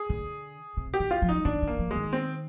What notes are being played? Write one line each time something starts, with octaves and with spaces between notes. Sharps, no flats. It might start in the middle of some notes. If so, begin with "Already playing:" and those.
Already playing: G#4
D3
C3
G4
D#3
F4
F3
D#4
D#3 D4
D#3
A#3
F3
D#3 G#3
C4